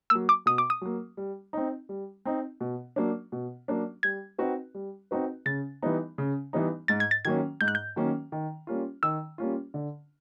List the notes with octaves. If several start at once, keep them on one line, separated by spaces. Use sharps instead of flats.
F#3 A#3 E6
D6
B2 D#6
D6
D#6
F#3 A#3
G3
C4 D#4
G3
C4 D#4
B2
F#3 A#3 D4
B2
F#3 A#3 D4
G3 G#6
C4 D#4 F#4 B4
G3
C4 D#4 F#4 B4
C#3 A6
E3 G3 B3 D#4
C#3
E3 G3 B3 D#4
G#2 A6
G#6
A6
D#3 F#3 A#3 C#4 G#6
G#2 G6
F#6
G6
D#3 F#3 A#3 C#4
D#3
G3 A#3 C#4 F4
D#3 E6
G3 A#3 C#4 F4
D3